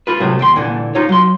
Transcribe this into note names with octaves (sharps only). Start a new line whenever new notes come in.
F4 A4 B4
A2 C3 F3 F#3 A3
D#2 G5 C6
A#2 D3 E3
D#4 F4 C#5
F#3 C6